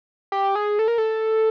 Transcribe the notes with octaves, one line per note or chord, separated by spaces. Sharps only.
G4
G#4
A4
A#4
A4